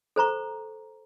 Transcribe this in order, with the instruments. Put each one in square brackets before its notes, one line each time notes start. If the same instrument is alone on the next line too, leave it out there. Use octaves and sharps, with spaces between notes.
[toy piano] A4 C5 A#5 C#6